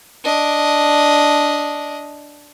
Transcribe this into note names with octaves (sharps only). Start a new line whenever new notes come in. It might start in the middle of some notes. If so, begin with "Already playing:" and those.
D4 D#5